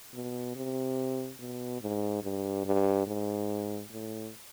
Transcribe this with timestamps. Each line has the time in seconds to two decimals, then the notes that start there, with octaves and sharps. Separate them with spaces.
0.13 B2
0.56 C3
1.39 B2
1.81 G#2
2.23 G2
2.65 G2
3.07 G#2
3.91 A2